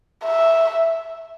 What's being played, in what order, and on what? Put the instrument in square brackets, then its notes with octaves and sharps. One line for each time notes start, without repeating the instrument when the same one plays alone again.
[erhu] E5